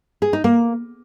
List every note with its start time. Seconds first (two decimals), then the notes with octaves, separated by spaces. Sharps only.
0.22 G#4
0.33 D#4
0.44 A#3